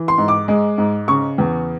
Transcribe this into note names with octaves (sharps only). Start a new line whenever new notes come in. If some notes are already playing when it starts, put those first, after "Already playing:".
Already playing: E3
C6
G#2
D6
G#3
G#2
C#3 C#6
E2